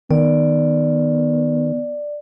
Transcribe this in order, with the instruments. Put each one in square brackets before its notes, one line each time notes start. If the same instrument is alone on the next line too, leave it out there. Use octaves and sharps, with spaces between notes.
[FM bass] D#3 [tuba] B3 [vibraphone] D5